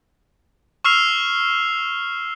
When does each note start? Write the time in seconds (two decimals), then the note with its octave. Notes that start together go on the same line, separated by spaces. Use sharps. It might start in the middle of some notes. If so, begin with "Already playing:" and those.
0.85 C#6 E6 F6 C7 F7